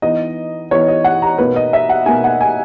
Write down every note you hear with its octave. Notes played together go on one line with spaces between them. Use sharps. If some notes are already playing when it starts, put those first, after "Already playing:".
E3 B3 D#4 D#5
E3 B3 D#4 C#5
D#5
F#5
A#5
B2 A#3 D#4 B4
D#5
E5
F#5
B2 A#3 D#4 G#5
F#5
G#5